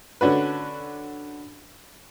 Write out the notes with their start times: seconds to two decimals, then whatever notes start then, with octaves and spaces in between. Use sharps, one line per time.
0.21 D3 C#4 D4 F#4 B4